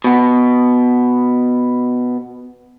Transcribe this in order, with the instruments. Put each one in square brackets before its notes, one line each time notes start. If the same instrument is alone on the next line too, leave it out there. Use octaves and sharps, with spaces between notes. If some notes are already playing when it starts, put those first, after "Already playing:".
[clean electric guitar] B2 B3